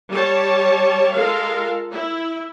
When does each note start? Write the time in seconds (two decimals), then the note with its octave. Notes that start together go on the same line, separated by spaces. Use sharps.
0.12 G3 C#5 A5
1.13 G#3 F4 A4 A#4 F5
1.92 E4